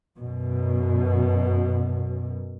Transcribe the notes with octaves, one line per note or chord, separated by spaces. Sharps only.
F#2 B2